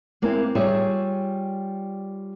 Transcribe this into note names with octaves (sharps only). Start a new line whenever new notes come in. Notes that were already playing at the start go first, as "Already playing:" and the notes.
G#3 A#3 C4 E4
G3 F4 G#4 C#5 E5